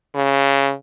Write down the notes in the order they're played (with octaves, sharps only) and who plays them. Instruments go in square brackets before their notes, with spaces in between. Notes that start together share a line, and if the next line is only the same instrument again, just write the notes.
[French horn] C#3